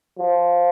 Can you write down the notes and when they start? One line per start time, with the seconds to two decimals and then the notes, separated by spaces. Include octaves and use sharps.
0.19 F3